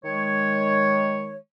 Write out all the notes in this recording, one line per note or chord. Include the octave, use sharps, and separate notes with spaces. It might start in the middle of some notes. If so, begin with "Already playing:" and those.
D#3 G#3 C#5